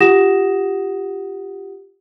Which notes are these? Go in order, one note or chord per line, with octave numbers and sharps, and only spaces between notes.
F4 G4 F#5 D#6 A#6 E7